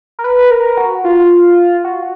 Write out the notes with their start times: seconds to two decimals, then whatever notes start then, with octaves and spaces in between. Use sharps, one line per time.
0.19 A#4
0.24 B4
0.50 A#4
0.77 F#4
1.04 F4
1.84 F#4